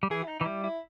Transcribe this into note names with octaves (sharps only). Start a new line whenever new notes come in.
G3
E3 G#4
E4
D#4
E3 D#4
G3 E4
E4